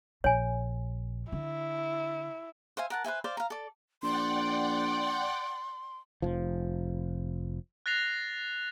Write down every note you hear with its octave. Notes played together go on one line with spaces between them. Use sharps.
A#1 C#5 G#5
D3 E4
C5 E5 F5 G#5
A#4 F#5 A5
B4 C5 E5 G#5
C5 D5 F5
F5 A#5
A4 D5
A#1 D5 F#5 G5 C6
F1 F3
F#6 A6 A#6 C7 F7